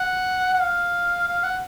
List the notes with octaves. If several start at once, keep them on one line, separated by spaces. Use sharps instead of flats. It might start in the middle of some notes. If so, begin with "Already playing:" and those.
Already playing: F#5
F#5
F5
F5
F#5